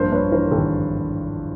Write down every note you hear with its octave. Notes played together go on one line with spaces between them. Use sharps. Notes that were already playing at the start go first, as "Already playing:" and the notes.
Already playing: A#1 G2 A#4 C5
G2 B4 C#5
E3 A#4 C5
A#4
G#1 G4 A4